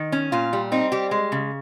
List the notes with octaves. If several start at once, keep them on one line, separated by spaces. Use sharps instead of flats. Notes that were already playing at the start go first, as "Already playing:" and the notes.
Already playing: D#3
C#4
A#2 F4
G3
C4 D#4
G3 G4
G#3
C#3